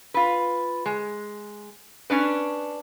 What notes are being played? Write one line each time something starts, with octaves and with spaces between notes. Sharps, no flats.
F4 B4
G#3
C#4 D4 B4